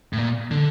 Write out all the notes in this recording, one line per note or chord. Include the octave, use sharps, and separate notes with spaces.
A2
A#2
D3